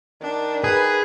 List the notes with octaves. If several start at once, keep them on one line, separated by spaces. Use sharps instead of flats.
D#3 D4
G#4 B4